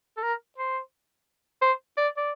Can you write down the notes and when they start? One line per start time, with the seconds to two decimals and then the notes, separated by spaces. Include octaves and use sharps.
0.17 A4
0.23 A#4
0.58 C5
1.62 C5
1.97 D5
2.17 D5